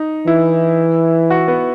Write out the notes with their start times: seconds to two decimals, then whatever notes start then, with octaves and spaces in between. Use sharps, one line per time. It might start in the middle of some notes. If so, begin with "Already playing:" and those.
Already playing: D#4
0.26 E3 E4
1.30 F#4
1.48 B3